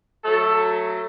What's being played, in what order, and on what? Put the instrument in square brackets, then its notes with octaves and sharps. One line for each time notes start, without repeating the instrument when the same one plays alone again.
[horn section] F#3 A3 A4